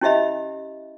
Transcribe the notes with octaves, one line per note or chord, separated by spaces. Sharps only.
C#4 E4 G4 D#5 E5 B5